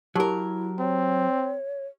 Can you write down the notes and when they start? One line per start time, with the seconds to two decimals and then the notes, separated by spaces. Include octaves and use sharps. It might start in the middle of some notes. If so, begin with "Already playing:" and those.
0.16 F#3 E4 G4 A#4 A5 D6
0.80 C4 C#5